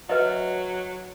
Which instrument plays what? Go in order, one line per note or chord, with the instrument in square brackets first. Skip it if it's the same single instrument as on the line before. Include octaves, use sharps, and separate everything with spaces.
[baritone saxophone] F#3 [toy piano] B4 D#5 E5